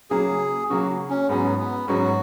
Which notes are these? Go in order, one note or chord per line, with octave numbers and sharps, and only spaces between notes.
C#3 F#3 A#3 G#4
C#3 F#3 A#3 F#4
C#4
G#2 F#3 B3 C#4
B3
G#2 F#3 C#4 F#4